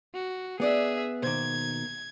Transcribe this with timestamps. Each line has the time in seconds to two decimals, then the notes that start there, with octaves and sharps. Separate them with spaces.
0.15 F#4
0.60 B3 D4 G#4 D5 E5 F#5
1.23 B2 D#3 A#3 C5 G#6